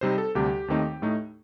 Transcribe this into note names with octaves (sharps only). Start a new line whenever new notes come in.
C3 G3 C4 D#4 C5
A4
D2 C3 G3 D4 G4
D#2 D#3 A3 C4 D#4
A2 A3 D#4